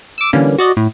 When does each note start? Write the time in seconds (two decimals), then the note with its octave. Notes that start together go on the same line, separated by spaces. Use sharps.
0.18 D6 E6
0.33 D3 E3 G3 A#3 C#4
0.58 F#4 D5 D#5
0.77 A2